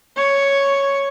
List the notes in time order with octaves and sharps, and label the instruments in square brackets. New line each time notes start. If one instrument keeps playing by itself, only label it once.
[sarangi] C#5